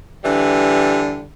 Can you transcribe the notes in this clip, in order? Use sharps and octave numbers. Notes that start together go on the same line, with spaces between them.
D3 E3 G3